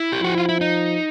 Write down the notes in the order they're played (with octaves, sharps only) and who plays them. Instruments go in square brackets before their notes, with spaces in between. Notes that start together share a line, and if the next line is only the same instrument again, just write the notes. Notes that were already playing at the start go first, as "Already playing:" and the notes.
Already playing: [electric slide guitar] E4
G4
[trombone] F3 [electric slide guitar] F#4
[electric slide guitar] F4
E4
D#4